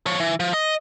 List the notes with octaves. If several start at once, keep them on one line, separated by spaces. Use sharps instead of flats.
F3 C#5
E3
F3
D#5